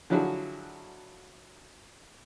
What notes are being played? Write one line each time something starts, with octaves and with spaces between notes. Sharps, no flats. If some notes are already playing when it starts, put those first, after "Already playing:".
D3 F3 F#3 E4 F#4 G#4